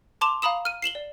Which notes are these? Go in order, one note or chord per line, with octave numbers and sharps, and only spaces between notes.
A5 C6 D6 E7 F7
F5 A#5 B5 D#6 E7
F6 D#7
C7 E7 F#7 G7
D5